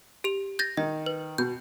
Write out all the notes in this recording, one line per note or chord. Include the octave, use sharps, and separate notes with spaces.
G4 F7
G6 A6 A#6
D#3 D#5
B4
B2 G6